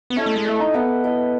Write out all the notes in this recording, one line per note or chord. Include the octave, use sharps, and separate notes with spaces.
B3
C#4 E4 A4 D#5
A3
G#3
A3 E4 A4 D#5
D#4
B3 E4 A4 D#5
E4 A4 D#5